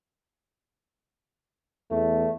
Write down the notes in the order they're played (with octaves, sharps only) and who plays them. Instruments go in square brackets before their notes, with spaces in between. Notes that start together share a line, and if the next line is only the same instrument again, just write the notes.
[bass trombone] E2 [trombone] A3